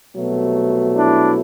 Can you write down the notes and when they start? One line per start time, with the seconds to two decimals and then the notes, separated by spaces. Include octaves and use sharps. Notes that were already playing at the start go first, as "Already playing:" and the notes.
0.15 C2 B2 F#3 A3
0.96 D4 E4